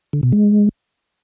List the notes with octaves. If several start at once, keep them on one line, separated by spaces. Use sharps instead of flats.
D3
B2
G#3